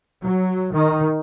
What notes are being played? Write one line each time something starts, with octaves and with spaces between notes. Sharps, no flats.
F#3
D#3